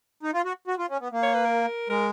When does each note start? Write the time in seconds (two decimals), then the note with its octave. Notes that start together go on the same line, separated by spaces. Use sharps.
0.23 D#4
0.34 F4
0.45 F#4
0.68 F#4
0.78 F4
0.90 C#4
1.01 B3
1.12 A#3
1.23 C#5
1.34 B4
1.45 A#4
1.89 G#3 A#4